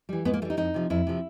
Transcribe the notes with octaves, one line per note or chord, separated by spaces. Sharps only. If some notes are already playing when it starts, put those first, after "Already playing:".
E3 G3
G#2 B3
A#3
E3 G3 A3 D#4
F2 D#4
C3 F3
F2 E4
C3 F3